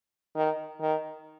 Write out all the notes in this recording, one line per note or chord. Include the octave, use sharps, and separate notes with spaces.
D#3
D#3